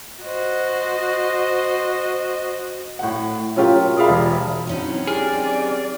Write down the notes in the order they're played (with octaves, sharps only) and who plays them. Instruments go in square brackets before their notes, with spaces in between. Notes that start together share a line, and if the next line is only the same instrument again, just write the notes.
[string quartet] F#4 C5 D#5
[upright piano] A2 F#5
F#3 C#4 F4 G4 A#4
F4 G#4 D5 E5 F5 B5
E1
[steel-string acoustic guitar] F#3 C#4 D#4 [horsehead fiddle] C4 E4
[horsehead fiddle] C4 D5 [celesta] G4 F6 [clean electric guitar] G#4